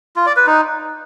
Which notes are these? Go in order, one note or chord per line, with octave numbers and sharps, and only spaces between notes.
F4
D5
B4
D#4